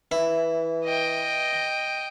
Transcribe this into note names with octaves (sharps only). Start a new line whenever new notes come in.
E3 E4
D#5 G5